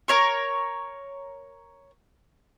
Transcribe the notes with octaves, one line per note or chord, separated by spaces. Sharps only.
A#4 C#5 C#6